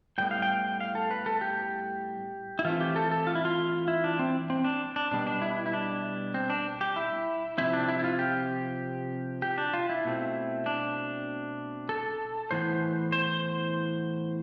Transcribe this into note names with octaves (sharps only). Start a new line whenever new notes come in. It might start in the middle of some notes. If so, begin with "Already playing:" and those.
A2 G3 B3 G5
F5
G5
F5
A4
B4
A4
G4
E4
E3 A3 C4 F4
G4
A4
A4
F4
E4
F4
E4
D4
C4
C4
D4
D4
B2 G3 B3 D4
D4
E4
E4
D4
C4
D4
G4
E4
C3 F3 C4 E4
D4
E4
E4
F4
G4
G4
D4
F4
E4
B2 A3 C4
D4
A4
A2 E3 B3 C5
C5